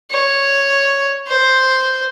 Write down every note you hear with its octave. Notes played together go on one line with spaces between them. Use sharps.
C#5
C5